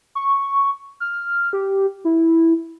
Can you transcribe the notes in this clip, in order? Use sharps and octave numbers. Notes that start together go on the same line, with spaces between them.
C#6
F6
G4
E4